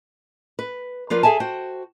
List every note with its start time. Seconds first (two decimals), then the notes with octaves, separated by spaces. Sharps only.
0.59 B4
1.10 F3 F4 A#4 B4 D5
1.23 G#4 A4 E5 G#5 A5
1.40 F#4 C5 G5